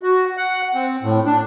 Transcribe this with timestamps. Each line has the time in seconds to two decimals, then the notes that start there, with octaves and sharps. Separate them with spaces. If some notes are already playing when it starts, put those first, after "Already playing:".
0.03 F#4
0.37 F#5
0.74 C4
1.03 A2
1.26 D4